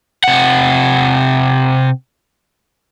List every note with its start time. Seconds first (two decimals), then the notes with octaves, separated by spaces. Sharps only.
0.24 C3 F#5